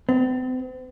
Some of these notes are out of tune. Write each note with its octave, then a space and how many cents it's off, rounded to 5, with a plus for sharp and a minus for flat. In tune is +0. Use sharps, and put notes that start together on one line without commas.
C4 -45